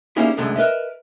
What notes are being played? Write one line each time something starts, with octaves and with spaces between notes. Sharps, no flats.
G3 A#3 C#4 D#4 E4 G#4
C2 F#2 D3 G#3 A3
A#4 B4 D#5 E5